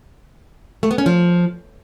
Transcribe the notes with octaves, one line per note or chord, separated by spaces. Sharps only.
A3
B3
C#4
F3